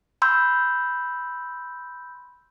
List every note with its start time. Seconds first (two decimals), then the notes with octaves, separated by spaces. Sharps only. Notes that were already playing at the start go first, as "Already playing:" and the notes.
0.22 B5 C6 E6 G6